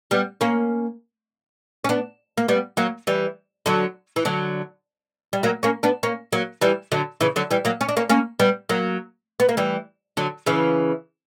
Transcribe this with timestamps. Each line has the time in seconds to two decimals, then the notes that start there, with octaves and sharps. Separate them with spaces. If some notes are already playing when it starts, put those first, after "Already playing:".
0.11 G3 B3
0.41 A#3 C#4
1.84 C#4
1.89 B3 D4
2.37 A#3
2.48 G3 B3
2.77 F#3 A#3
3.07 E3 G3
3.66 D3 F#3
4.16 E3
4.25 D3 F#3
5.33 G3
5.43 F#3 A#3
5.63 A#3 C#4
5.83 B3 D4
6.03 A#3 C#4
6.32 F#3 A#3
6.61 E3 G3
6.92 D3 F#3
7.21 C#3 E3
7.36 D3 F#3
7.51 E3 G3
7.65 F#3 A#3
7.81 C#4
7.89 D4
7.97 A#3 C#4
8.09 A#3 C#4
8.40 G3 B3
8.69 F#3 A#3
9.40 B3
9.49 A#3
9.57 E3 G3
10.17 D3 F#3
10.46 C#3 E3